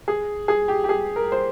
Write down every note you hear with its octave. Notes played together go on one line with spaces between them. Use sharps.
G#4
G#4
G4
G4
G#4
A#4
C5